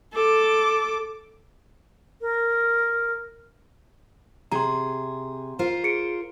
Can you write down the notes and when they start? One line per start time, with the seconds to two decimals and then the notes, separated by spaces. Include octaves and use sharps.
0.13 A4 D6
2.21 A#4
4.52 C3 G#4 A#5 C6
5.59 F4 A#4 C5
5.84 G#4 C#7 D7